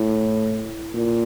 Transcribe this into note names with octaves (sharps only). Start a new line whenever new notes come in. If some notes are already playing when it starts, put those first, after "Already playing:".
Already playing: A2
A#2